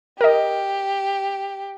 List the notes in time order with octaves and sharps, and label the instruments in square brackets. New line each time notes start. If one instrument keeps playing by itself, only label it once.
[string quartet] G4 [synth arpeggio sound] A#4 D#5